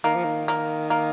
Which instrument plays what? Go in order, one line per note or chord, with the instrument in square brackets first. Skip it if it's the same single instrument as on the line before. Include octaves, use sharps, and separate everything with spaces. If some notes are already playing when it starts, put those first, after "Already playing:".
[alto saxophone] D#3 [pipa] A#3
[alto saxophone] F3
D#3
[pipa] A#3
A#3